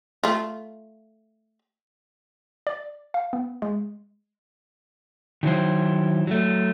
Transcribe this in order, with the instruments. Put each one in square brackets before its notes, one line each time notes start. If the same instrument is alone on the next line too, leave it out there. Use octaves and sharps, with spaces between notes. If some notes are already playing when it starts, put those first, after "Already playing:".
[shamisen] A3 F4
[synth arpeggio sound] D5
F5
B3
G#3
[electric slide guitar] D#3 F#3 E4 C5
F#3 A3